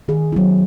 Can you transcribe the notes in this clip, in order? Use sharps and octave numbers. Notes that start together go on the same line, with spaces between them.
D#3 G#4
F#3 B3 E4